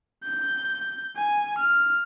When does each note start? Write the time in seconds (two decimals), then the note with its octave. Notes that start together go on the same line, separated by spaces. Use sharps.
0.24 G6
1.16 G#5
1.59 F6